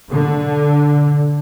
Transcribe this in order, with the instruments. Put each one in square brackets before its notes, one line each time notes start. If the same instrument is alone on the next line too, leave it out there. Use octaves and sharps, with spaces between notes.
[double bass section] D3